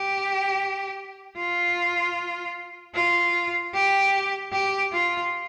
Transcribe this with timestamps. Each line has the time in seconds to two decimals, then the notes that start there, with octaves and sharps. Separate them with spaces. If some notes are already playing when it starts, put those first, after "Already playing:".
Already playing: G4
1.37 F4
2.95 F4
3.74 G4
4.52 G4
4.93 F4